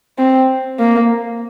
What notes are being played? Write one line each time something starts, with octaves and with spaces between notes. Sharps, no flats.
C4
A#3